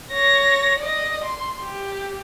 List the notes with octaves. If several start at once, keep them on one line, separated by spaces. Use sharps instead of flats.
C#5 A#6
D5 D#5
C6
G4